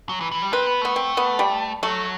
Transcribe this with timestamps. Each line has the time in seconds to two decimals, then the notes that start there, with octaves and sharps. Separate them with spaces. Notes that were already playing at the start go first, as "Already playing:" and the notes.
0.09 F#3
0.21 E3
0.32 E3
0.42 G3
0.52 C4 B4
0.67 B3
0.81 A3 B3
0.96 C4
1.17 B3
1.39 G3
1.83 F#3 A3